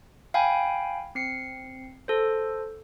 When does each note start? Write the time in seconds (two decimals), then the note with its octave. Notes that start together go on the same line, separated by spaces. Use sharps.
0.34 F5 G5 G#5 B5
1.15 C4 C7 C#7
2.08 A4 C5